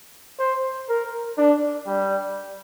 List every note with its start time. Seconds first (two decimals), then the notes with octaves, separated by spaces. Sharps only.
0.39 C5
0.89 A#4
1.38 D4
1.87 G3